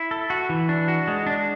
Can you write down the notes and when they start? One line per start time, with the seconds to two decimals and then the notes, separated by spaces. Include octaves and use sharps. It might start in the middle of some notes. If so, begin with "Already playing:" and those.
Already playing: E4
0.11 A4
0.30 F#4
0.49 E3
0.69 D4
0.88 F#4
1.08 G#3
1.27 D4